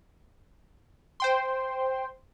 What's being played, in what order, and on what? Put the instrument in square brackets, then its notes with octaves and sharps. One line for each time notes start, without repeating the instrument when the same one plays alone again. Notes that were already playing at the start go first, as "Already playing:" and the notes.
[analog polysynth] C5 G5 C6